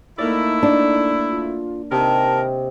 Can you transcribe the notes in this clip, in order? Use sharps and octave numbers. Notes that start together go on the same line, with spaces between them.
A3 A#3 D#4 E4 A#4 D5
D4
F4
C3 D#3 A#4 D#5 A5 G6